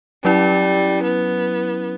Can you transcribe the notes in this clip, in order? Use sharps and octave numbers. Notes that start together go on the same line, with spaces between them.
F#3 G3 C#4 E4
B3